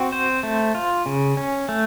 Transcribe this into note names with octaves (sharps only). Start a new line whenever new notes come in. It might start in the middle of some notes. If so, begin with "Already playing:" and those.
Already playing: C4 F#4
C5
A3
F4
C#3
C#4
A3